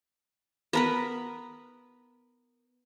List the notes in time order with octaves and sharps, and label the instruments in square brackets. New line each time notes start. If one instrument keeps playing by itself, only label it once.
[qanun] B3 A#4 B4